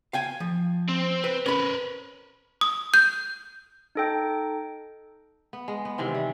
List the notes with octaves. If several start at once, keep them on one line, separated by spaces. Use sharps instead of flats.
F5 G5 G#5
F3
C4
B4
C#4 A#4 B4 B5
D#6
G6
D#4 A4 G5
B3
G#3
B3
C3 D#3 E3 C4
G3